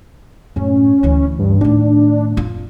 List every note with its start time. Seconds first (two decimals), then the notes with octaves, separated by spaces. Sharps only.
0.56 F#2 A2 C#4
1.03 D2 E3
1.39 G2
1.61 A2 D#3 D4
2.37 F2 F4